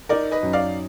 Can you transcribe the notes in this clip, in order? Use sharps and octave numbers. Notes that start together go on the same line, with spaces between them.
D#4 A#4 D5
B4 D#5
F#2
D5 F5